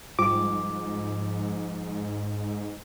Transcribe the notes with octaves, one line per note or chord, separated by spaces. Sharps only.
G#2 F3 G3 D6